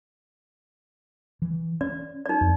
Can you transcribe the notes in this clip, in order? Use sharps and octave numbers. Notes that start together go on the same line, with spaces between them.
E3
C#4 D5
D#4 D5
F2